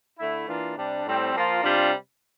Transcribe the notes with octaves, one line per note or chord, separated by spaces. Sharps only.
D3 A3 E4
E3 A#3 D4 F4
C3 G3 D4
A2 G3 C4
F3 A#3 F4
C3 G3 D4 F4